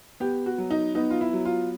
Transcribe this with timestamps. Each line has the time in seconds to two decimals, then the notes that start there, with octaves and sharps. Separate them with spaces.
0.20 B3 G4
0.46 F#4
0.58 F#3
0.71 D#4
0.95 B3 D#4
1.10 F4
1.21 E4
1.33 F#3
1.45 F4